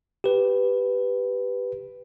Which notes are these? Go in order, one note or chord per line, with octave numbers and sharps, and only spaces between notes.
G4 B4